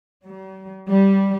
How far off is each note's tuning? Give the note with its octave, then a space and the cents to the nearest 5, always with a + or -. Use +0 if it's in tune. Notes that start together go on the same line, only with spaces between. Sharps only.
G3 -45
G3 -5